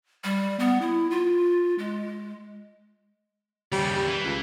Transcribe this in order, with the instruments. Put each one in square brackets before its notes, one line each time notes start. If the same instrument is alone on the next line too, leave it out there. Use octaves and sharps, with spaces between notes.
[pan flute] G3
B3
E4
F4
G#3
[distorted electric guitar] D#2 C#3 [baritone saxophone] G3
[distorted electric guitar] E3
[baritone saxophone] C#2